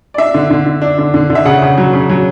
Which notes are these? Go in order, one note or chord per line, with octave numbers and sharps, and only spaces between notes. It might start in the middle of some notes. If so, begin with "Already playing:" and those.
D5
D4 E5
D3
D3
D3
D4
D3
D3
D3
E5
C#3 F#5
C#3
F#3
C#3
F#3